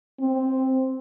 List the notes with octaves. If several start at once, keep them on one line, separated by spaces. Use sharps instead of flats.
C4